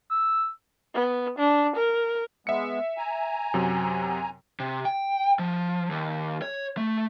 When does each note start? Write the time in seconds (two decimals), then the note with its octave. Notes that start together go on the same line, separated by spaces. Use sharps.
0.11 E6
0.94 B3
1.39 D4
1.76 A#4
2.47 G#3 B3 E5 C#7
2.98 G#5 A#5
3.54 F#2 C3 F#3
4.60 C3
4.85 G5
5.39 F3
5.90 D#2
6.42 C#5
6.77 A3